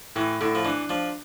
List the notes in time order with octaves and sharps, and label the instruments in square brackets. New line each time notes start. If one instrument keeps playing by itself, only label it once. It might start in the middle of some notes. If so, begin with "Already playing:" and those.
[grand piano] A2 [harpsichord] E3
[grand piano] A2 [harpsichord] D3
[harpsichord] F3
[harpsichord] E3 [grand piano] D4
[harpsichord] F3 [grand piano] D4